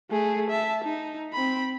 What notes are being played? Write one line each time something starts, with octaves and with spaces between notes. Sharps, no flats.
A3 G#4
E5 A5
D#4
C4 B5